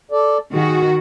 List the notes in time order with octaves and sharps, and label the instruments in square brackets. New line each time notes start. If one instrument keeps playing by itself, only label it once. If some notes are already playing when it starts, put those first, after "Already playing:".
[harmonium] A4 D5
[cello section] D#3 F#4 [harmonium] G#4